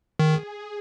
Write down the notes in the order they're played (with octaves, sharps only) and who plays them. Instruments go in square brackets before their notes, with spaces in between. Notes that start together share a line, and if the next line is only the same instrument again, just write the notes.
[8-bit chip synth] D#3 [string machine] G#4